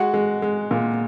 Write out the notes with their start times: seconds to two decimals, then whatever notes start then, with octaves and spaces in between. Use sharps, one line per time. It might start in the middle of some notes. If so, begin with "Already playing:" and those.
Already playing: G#3 F#4 F#5
0.14 G#3
0.42 G#3
0.71 A#2